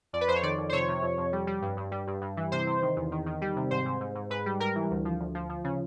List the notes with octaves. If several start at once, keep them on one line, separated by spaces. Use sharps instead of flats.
F2 D5
B4
F2 C5
C#5
D#3 D5
F2
C5
C3 C#5
C3
F2
F2
G3
G3
G2
G2
G3
G2
G2
E3
C3 C5
C3
D#3
E2
D#3
D#3
G3
C3
G#2 C5
G#2
G#2
G#2
G#2 B4
G3
G3 A#4
E3
D2
F3
D2
F3
F3
C#3